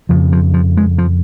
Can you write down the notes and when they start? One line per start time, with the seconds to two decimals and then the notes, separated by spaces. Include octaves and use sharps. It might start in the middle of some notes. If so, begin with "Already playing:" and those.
0.09 F2 C#3 F3
0.33 F3
0.54 F3
0.77 G#3
0.98 F3